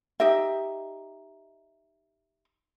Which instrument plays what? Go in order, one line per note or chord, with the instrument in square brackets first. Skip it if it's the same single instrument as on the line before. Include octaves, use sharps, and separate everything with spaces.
[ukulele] D#4 G4 D#5 E5